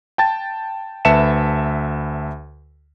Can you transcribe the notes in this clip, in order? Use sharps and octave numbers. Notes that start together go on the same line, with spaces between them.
G5 A5 A6
D2 B4 E5 A5 C#7 E7